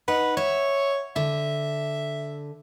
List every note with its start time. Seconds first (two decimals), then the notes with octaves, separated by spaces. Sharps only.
0.08 D#4 B4 F#5
0.37 C#5 E5
1.16 D3 E5